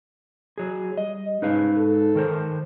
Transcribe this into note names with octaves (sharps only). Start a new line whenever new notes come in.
F#3 G#4
G3 D#5
G#2 C#3 D#4 B4 F5
A4
D#3 A#4 C5